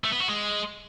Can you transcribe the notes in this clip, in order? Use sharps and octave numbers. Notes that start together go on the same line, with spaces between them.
A3
B3
F#4
G#3